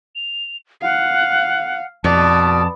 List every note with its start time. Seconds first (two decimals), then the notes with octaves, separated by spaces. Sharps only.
0.16 F7
0.82 F5 F#5
2.04 F2 B2 D5 A5